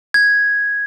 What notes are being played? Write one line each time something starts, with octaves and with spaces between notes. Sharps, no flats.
G#6